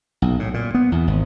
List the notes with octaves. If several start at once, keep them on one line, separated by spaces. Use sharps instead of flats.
B1
A2
A#2
B3
E2
G#1